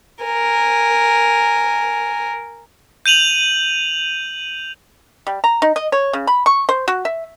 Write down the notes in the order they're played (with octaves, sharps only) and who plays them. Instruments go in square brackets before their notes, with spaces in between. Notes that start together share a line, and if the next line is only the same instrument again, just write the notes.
[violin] A#4 G#5
[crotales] G6 D#7 F7 F#7
[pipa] G3
A#5
D#4
D#5
C#5
C#3
B5
C#6
C5
F#4
E5